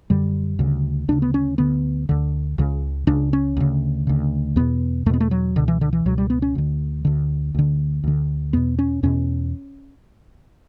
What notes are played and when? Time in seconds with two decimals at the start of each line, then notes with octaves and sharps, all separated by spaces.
0.10 F#2 D3 G3
0.59 D2 C#3
1.08 D2 C#3 D4
1.22 B3
1.34 C#4
1.58 D2 D3 B3
2.09 D2 D3
2.58 C#2 C#3
3.07 C#2 C#3 D4
3.33 C#4
3.57 D2 C#3
4.07 D2 C#3
4.56 E2 B2 B3
5.06 E2 A3
5.09 B2 B3
5.20 A3
5.31 F#3
5.56 C#2 B2 D3
5.68 E3
5.81 D3
5.93 E3
6.06 C#2 B2 F#3
6.18 G3
6.30 B3
6.42 C#4
6.55 D2 D3
7.05 D2 D3
7.55 D2 D3
8.04 D2 D3
8.53 E2 B2 B3
8.79 C#4
9.03 E2 B2 C#4